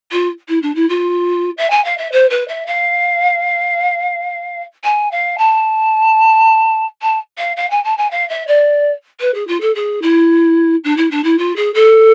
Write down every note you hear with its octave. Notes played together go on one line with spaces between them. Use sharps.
F4
E4
D4
E4
F4
E5
G#5
F5
E5
C5
B4
E5
F5
G#5
F5
A5
A5
F5
F5
G#5
A5
G#5
F5
E5
D5
B4
G#4
F4
A4
G#4
E4
D4
E4
D4
E4
F4
G#4
A4